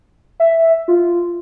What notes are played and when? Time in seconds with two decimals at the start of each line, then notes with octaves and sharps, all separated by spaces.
0.40 E5
0.88 F4